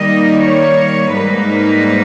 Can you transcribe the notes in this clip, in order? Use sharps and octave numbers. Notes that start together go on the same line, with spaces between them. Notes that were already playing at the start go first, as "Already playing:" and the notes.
Already playing: D#3 G3 A#3 D#4 D#5
C#5
G#2 G3 A#3 D#4 B4